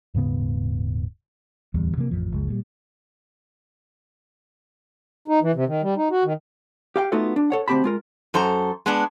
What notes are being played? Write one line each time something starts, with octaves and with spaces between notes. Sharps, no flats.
D#1 G#2 C#3 B3
D1 E2 G3
C3 F3 G3 A#3
A1 F2 F3
F#1 C#2 F3 G#3
A#2 F3 G3
D#4
E3
C3
D#3
G3
D#4
F#4
D#3
G4 F5 G5
A3 B3 D#4 F4 F#4 A4
D4
A4 C#5 F#5
D2 C4 C#4 G4 A5 B5
G#3 F4 A#4
F#2 A4 C5 A#5
G#3 B3 D4